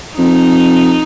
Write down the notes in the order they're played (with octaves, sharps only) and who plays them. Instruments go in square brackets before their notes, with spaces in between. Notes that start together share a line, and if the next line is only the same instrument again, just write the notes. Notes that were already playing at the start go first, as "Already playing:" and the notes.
[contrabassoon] F2 [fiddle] D#4